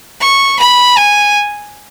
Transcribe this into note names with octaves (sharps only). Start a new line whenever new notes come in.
C#6
B5
G#5